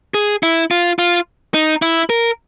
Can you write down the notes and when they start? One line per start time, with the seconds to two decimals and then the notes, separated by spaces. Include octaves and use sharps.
0.14 G#4
0.43 E4
0.71 F4
0.99 F4
1.54 D#4
1.82 E4
2.10 A#4